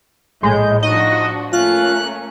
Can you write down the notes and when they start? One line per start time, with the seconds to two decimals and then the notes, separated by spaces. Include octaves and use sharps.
0.43 A#1 A2 G#3 G6
0.83 F3 D4 D#4 F#4 D#5
1.53 A3 A#3 C#4 F4 F#6